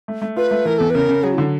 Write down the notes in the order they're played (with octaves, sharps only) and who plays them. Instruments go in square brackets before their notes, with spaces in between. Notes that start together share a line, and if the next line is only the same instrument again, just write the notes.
[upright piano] A3
A3
[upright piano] F4 [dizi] B4
[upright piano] A3
[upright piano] E3 [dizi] A#4
[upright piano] E2 [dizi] A4
[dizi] B4
[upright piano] C#3 [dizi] A#4
[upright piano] C#3
[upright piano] F#3 [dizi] G#4
[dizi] E4
[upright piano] D3